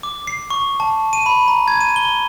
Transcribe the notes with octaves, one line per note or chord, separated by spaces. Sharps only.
D6
C7
C#6
A5
D#7
B5
A#5
G#6
D#7
G7